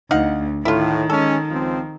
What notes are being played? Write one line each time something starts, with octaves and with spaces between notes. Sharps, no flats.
D2 D#4 F5 F#5
A2 D#3 E4 F4
G#3 C#4 A4
C#2 F3 C4